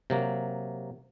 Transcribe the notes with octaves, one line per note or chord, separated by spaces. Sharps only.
C3 F#3 A#3